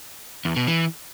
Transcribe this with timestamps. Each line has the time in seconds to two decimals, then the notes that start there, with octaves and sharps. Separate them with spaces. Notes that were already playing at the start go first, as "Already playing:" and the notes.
0.45 E2
0.56 B2
0.67 E3